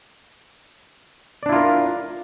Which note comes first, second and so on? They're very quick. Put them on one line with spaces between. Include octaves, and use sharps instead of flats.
D5 D4 E4 F4 A#4